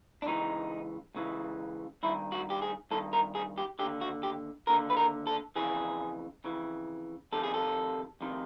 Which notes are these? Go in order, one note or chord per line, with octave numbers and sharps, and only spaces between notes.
D4
C#2 C#3 E3 D#4
C#2 C#3 E3
G2 D#3 E4
F#4
G4
G#4
G2 D#3 A4
A#4
G#4
G4
D#2 D3 G4
F#4
G4
D#2 D3 A#4
B4
A#4
A4
F2 C#3 E3 G#4
F2 C#3 E3
F2 C3 D#3 A4
G#4
A4
F2 C3 D#3